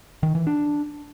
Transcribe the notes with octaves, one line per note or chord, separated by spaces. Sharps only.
D#3
E3
D4